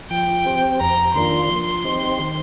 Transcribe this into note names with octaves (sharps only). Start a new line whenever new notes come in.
F3 G5
C4 G4 C5
F2 A#5
D#3 A#3 D4 F4 C6
F3
C4 D#4 G4 C5
D#3